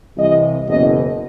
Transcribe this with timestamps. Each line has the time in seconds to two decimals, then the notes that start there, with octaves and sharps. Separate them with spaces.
0.17 C2 C3 E3 D#5
0.67 F#1 E2 B2 D#5